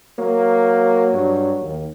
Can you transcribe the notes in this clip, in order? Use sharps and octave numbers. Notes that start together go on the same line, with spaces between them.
F#3 A#3
G2
D#2